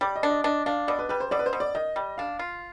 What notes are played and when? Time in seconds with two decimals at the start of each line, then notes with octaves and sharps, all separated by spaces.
0.01 G3 D5
0.16 D#5
0.23 D4
0.30 D#5
0.44 D4 D#5
0.66 D4 F5
0.88 B2 D5
0.99 B4
1.09 G3 B4
1.20 C5
1.31 B2 D5
1.39 B4
1.46 C5
1.53 B2
1.60 D5
1.75 D#3 D#5
1.96 G3
2.18 D4 F5
2.39 F4